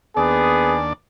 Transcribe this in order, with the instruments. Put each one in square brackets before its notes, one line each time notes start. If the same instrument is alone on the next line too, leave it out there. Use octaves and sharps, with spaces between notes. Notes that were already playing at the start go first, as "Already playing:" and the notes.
[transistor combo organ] D#2 D4 D5 [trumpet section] B3 G#4